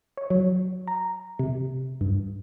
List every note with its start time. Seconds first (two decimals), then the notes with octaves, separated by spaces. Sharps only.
0.17 C#5
0.30 F#3
0.87 A#5
1.39 C3
2.01 G2